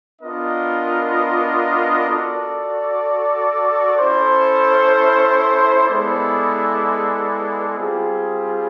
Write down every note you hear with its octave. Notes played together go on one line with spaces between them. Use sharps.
B3 D4 F4 A#4 D#5
F#4 A4 D5
C#4 E4 A4 C5
G#3 B3 E4 A4 D5
G3 C4 F4 G#4